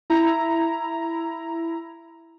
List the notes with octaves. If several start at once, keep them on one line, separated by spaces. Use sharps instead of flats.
E4 A#5